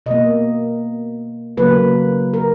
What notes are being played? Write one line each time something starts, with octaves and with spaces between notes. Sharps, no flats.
B2 A#3 D#5
C#3 F#3 A#3 B4
A#4